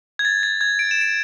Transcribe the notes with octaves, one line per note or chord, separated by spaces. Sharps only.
G#6
A6
A6
G#6
D7
E7
D7